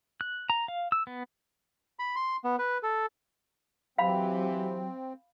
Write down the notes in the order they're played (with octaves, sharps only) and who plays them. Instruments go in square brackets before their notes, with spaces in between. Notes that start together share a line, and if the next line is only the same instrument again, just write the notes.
[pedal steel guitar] F#6
A#5
F5
E6
B3
[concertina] B5
C6
B3
B4
A4
[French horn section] E3 G4 [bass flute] F#3 [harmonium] C4 [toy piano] F5 B5